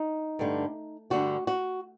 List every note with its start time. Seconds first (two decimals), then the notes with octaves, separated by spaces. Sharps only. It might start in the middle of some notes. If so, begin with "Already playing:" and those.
Already playing: D#4
0.39 G2 D3 A3
1.10 G2 D3 A3 F#4
1.47 F#4